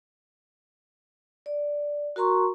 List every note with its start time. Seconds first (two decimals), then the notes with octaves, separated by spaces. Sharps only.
1.46 D5
2.16 F#4 A#4 A#5 C6 C#6